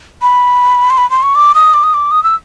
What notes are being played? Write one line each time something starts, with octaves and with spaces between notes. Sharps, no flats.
B5
C6
B5
C6
C#6
D6
D#6
D6
D#6
D6
D#6
E6